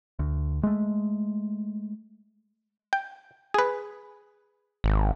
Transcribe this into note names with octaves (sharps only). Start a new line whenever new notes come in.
D2
G#3 A3
G5
G#4 B4
G#1